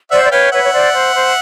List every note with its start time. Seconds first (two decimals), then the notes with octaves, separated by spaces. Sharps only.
0.11 C5 D5 E5 F#5
0.23 D5
0.31 B4 C#5 F5 G5
0.52 B4 C#5 E5 F#5
0.64 C#5
0.72 C5 D5
0.94 C5
1.15 C5